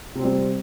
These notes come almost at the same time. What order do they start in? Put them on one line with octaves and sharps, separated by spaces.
C3 C4 G3